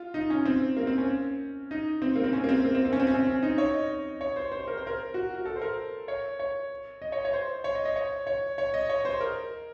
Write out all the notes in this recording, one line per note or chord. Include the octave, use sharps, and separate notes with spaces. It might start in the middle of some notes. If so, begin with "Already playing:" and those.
Already playing: F4
D#4
C#4
C4
A#3
C4
C#4
D#4
C4
A#3
C4
C#4
A#3
C4
A#3
C4
C4
C#4
C4
C#4
C4
C#4
D#4
C#5
D#5
C#5
C5
C5
A#4
C5
A#4
F#4
F#4
A4
C5
A#4
C#5
C#5
D#5
C#5
C#5
C5
C#5
D#5
D#5
C#5
C#5
C#5
D#5
C#5
C5
A#4